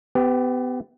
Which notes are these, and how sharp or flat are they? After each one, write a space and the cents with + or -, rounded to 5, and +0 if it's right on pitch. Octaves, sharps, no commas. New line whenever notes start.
B3 +30 G4 +0